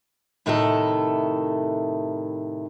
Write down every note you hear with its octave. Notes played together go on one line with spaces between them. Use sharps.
A2 C3 D#3 A3 E4 A4